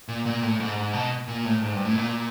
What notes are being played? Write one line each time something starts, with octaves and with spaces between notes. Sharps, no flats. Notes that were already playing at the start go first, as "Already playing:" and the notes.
A#2
A#2
A2
G#2
G#2
B2
A#2
A2
G#2
G2
A2
A#2